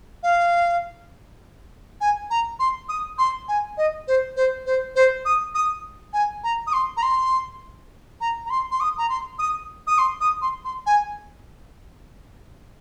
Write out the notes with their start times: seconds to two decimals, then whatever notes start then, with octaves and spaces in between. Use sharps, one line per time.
0.23 F5
2.01 G#5
2.30 A#5
2.59 C6
2.89 D#6
3.18 C6
3.48 G#5
3.77 D#5
4.08 C5
4.36 C5
4.66 C5
4.95 C5
5.25 D#6
5.55 D#6
6.13 G#5
6.44 A#5
6.67 D#6
6.73 C6
6.97 A#5
7.03 C6
8.21 A#5
8.46 A#5
8.50 C6
8.71 C6
8.80 D#6
8.98 A#5
9.09 C6
9.39 D#6
9.87 D#6
9.98 C6
10.21 D#6
10.42 C6
10.65 C6
10.86 G#5